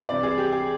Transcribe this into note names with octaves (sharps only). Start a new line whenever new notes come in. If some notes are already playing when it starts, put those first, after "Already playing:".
C2 C3 E3 D5
G#4
G4
G#4